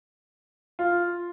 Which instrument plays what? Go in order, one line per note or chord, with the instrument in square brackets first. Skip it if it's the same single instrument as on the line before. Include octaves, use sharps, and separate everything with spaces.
[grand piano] F4